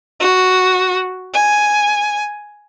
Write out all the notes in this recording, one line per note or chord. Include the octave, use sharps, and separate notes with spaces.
F#4
G#5